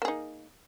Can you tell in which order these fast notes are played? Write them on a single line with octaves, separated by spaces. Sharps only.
A#3 G#4 D#4